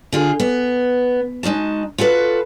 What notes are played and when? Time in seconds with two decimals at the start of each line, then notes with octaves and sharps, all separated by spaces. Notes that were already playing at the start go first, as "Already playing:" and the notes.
0.12 D3 F4 G#4
0.40 B3
1.43 G#3 D#4 F#4 A5
1.98 F4 F#4 A4 B4